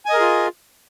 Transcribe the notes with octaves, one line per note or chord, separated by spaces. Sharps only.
F4 G#4 A#4 D#5 G#5